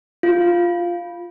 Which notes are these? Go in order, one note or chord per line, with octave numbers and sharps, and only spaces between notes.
F4